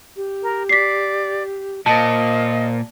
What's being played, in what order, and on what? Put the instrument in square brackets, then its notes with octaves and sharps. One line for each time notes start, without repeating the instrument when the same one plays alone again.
[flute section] G4
[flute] A#4
[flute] D5 [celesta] B6 C7
[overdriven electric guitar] A#2 [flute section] A#4 C5 F5 [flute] D#5 [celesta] A5